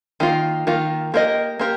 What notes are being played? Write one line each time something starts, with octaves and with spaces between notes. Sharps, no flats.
D#3 A#3 F4
D#3 A#3 F4
A#3 G4 A#4 D#5
A#3 G4 A#4